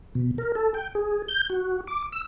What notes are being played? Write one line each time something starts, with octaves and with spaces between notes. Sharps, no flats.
B2
A#4
A4
G5
G#4
G6
F#4
D6
E6